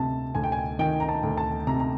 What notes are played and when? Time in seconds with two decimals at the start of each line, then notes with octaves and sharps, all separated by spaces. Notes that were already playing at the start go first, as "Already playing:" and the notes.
Already playing: D2 C3 A5
0.35 D2 G#5
0.44 G5
0.52 G#5
0.79 D#3 G5
1.00 A#5
1.09 A5
1.23 D2
1.38 A5
1.67 C3 A#5
1.80 A#5